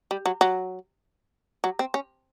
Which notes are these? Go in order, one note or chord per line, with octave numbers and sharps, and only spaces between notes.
G3
F#3
F#3
F#3
C4
C#4